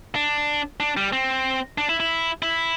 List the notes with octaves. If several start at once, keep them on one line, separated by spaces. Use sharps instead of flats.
D4
D4
G3
C4
D4
E4
E4
E4